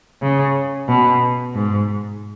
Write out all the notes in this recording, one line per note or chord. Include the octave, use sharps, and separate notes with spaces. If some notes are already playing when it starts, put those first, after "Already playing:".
C#3
B2
G#2